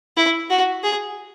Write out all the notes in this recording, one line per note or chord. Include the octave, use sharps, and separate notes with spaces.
E4
F#4
G#4